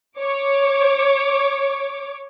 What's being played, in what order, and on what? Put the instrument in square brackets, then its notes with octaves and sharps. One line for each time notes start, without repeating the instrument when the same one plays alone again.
[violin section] C#5 D6